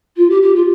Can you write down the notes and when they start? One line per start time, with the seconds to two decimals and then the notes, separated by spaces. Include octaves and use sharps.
0.17 F4
0.30 G4
0.42 G4
0.55 F4